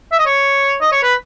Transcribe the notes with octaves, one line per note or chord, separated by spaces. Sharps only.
E5
D#5
C#5
D#5
C#5
B4